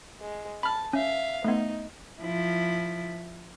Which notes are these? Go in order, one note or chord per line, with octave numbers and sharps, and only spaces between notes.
G#3
A5 B5 F6
C#4 E5 F5
A3 B3 D#4
F3 E4